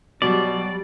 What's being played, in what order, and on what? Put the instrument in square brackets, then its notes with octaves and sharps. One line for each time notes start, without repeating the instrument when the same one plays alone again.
[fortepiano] B2 [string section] F#3 G3 [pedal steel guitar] D5